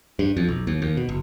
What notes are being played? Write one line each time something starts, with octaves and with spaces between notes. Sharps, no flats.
G2
F2
B1
D#2
D#2
B2
F#1